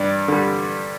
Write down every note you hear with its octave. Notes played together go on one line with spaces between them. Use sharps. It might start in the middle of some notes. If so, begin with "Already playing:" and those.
Already playing: G2 D5
D3 G3